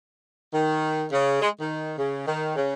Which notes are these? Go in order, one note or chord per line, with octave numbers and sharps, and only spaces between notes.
D#3
C#3
G#3
D#3
C#3
D#3
C#3